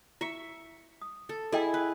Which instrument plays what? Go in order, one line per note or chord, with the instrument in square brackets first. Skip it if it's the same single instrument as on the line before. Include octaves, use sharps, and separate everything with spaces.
[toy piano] E4 [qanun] E5 C#6
[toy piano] D#6
[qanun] A4
[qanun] E4 G#4 [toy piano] A4 D#5 G5
[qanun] B4